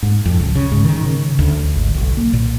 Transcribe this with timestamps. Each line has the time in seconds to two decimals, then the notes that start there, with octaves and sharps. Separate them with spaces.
0.03 G#2
0.26 F2
0.40 C#2
0.55 C#3
0.72 G#2
0.85 D#3
1.04 C#3
1.39 D2
1.76 G#1
1.94 B1
2.17 A#3
2.33 A#2